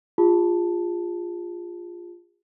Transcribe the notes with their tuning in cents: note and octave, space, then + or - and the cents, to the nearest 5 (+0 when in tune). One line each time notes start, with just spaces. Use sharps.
F4 +0 G#4 -40 A5 +0